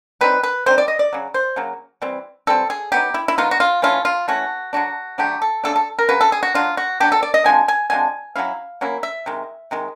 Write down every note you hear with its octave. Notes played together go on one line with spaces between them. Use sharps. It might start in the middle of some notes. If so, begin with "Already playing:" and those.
E3 G3 C4 D#4 B4
B4
E3 G3 C4 D#4 C5
D5
D#5
D5
C#3 F#3
C5
C#3 F#3 A#3
E3 G3 C4
E3 G3 C4 A4
G#4
F#3 B3 D#4 G4
E4
E4
F#3 B3 D#4 F4
F#4
F4
E3 A3 C#4 E4 F4
F4
E3 A3 C#4 E4 F#4
D3 F#3 A3 D4 F#4
D3 F#3 A3 D4 G4
A4
C#3 F#3 A3 D4 A4
A4
A#4
C#3 F#3 B4
A4
G#4
F#4
F#3 B3 D4 F4
F#4
F#3 B3 D4 G4
A4
D5
D#5
D3 F3 G#3 C4 G#5
G#5
D3 F3 G#3 C4 G#5
F#3 A#3 C#4 E4 F5
F#3 A#3 C#4 E4
E5
C3 D#3 G#3
C3 D#3 G#3